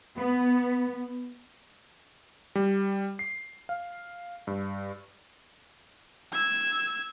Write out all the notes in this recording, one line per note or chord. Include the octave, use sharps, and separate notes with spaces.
B3
G3
C7
F5
G2
E6 G#6